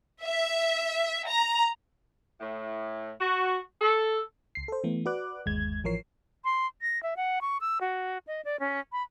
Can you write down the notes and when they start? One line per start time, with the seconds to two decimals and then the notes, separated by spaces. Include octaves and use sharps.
0.24 E5
1.27 A#5
2.41 A2
3.21 F#4
3.82 A4
4.55 C#2 C7
4.68 A4 C5
4.84 E3 A3 B3
5.06 F#4 B4 D5 D6 F#6
5.46 G1 D#2 G#3 G#6
5.84 A1 E3 F3 A#4 C#5 C7
6.44 C6
6.81 A#6
7.03 E5
7.16 F#5
7.41 C#6
7.61 E6
7.81 F#4
8.27 D#5
8.45 D5
8.60 C#4
8.92 B5